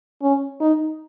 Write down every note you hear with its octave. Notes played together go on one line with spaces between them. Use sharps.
C#4
D#4